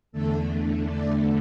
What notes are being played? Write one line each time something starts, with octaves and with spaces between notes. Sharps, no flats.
E2 D3 A3 A4
D5